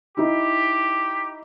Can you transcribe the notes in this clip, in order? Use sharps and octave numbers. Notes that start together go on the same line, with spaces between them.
D#4 E4 G4